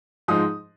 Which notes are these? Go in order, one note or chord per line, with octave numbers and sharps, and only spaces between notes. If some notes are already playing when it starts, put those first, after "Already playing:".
G#2 F3 G#3 D#4 D#6